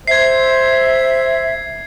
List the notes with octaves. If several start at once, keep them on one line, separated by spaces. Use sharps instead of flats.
C5 E5 G#6 C7